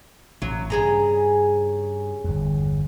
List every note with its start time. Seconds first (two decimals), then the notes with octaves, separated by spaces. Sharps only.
0.42 A1 A#2 F#3
0.70 G2 C#3 G#4 A#5
2.24 G1 E2